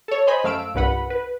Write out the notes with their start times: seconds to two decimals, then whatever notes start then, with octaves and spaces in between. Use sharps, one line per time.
0.08 A4 C#5
0.27 C5 D#5 G#5 B5
0.44 F#2 A3 F5 E6 D7
0.74 C2 G2 A#2 B4 F#5 B5
1.10 B4